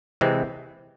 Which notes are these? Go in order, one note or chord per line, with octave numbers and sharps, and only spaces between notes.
C3 E3 G#3 C4